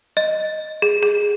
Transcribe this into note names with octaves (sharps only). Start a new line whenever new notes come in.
D#5
G#4
G#4